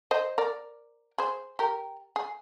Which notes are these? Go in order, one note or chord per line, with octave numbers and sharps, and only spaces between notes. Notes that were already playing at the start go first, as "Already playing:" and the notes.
C5 D#5
A#4 D5
G#4 C5
G4 A#4
G#4